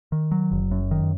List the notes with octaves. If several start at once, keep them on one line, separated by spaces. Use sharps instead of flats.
D#3
F#3
F#1
F#2
D#3